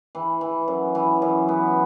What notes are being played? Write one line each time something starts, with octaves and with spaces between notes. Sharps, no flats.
E3
E3
F#2
E3
F#2
B3